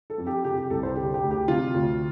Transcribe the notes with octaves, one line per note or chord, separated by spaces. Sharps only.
A4
F2
G4
C3 G4
G4
C2 A4
C5
D3 G4
G4
D2
G4
C3 F4
D2